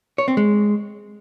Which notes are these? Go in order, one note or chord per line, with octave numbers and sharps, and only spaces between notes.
C#5
C4
G#3